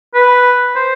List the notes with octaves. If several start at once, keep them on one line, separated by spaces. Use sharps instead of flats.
B4
C5